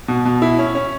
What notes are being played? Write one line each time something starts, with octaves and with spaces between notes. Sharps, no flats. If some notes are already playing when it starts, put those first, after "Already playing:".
B2
B2
E4
C#4
C#4